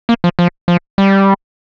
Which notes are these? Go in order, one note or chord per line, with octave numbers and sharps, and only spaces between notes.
A#3
F3
F3
F3
G3